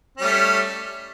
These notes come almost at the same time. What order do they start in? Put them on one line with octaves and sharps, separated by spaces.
C#4 G3 A3